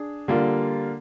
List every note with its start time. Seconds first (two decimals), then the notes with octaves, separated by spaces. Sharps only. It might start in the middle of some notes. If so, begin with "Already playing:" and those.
Already playing: D4 G#4
0.28 D3 G3 A#3 F4